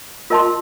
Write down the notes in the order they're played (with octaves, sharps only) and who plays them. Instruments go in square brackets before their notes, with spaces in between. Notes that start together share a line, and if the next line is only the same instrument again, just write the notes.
[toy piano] F4 A#4 D#5 A5 C6